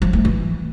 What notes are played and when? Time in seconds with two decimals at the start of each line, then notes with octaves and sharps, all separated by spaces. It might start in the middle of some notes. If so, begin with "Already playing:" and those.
0.02 F3
0.13 A3
0.25 E3